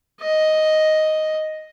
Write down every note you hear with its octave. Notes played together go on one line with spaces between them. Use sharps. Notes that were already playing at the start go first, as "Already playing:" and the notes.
D#5